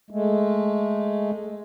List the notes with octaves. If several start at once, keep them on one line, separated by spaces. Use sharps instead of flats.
G#3 A3